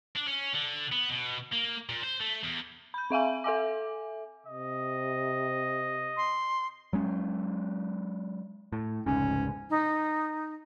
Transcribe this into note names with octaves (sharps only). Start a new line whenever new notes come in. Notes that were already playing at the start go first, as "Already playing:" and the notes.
D4
C#4
D3
B3
B2
A#3
A#2
C5
A3
E2
B5 G6
C4 E5 F5 G#5
A4 E5 G#5 D6
C3 D#5
C6
F#3 G#3 C#4
A2
F1 C#2 G#2 C#4
D#4